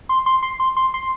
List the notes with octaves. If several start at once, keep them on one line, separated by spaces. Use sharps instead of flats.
C6
C6
C6
C6
C6
C6